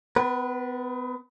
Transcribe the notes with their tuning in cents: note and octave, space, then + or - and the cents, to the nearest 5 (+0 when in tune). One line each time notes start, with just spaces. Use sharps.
B3 +35 B4 -25